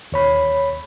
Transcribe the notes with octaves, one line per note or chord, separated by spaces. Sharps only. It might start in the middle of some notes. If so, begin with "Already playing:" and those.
D#2 C#5 B5